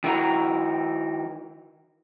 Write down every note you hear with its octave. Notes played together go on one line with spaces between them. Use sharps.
D#3 E4 F#4 A#5